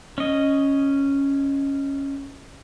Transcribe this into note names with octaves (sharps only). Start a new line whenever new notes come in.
C#4 D#5